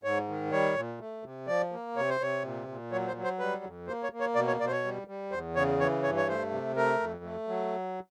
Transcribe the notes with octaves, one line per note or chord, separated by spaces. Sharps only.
G#2 C#5
D#3
G3 C#5
A#2
A3
C3
F3 D5
A#3
C3 C#5
C5
C3 C#5
A#2
A#2
F#3 C#5
C5
F#3
C5
G3 B4
F2
A#3 C5
C#5
A#3
C#5
B2 D5
C#5
B2 D5
C5
C#5
G3
G3
E2 C5
C#3 C#5
E3 C#5
G2 C#5
C#5
A3 C5
C3
A3 A#4
F2
A3
F#3